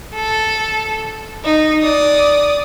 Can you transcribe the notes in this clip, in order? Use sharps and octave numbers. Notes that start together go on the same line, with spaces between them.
A4
D#4
D5 D#6